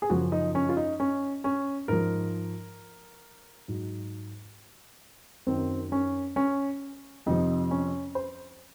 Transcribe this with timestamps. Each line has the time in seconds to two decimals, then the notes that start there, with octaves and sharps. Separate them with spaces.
0.02 G#4
0.10 F#2 C#3 F3 F#4
0.32 D#4
0.55 C#4
0.69 F4
0.77 D#4
1.00 C#4
1.44 C#4
1.88 G#2 F3 A#4
3.68 G#2 F#3
5.47 F#2 D#3 F#3 C4
5.92 C#4
6.36 C#4
7.26 F2 C3 F3 D#4
7.71 C#4
8.15 C5